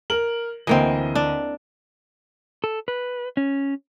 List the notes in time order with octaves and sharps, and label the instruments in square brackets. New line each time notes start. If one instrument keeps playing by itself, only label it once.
[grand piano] A#4 F#7
[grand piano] D2 D#5 [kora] E3 A#3 C4
[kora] D4
[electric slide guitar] A4
B4
C#4